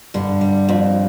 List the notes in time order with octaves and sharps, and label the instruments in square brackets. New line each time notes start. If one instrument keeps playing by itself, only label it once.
[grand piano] G2 [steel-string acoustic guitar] D3
[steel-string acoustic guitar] G3
F2